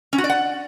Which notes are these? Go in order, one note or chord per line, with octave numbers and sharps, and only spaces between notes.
C#4
F#4
D5
F#5